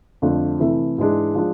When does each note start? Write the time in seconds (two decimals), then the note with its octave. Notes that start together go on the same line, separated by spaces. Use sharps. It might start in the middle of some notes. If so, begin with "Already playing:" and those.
0.22 F2 D3 F3 A3 D4
0.60 C3 E3 A3 E4
0.98 G#2 E3 G#3 D4
1.35 F3 G#3 D4 F4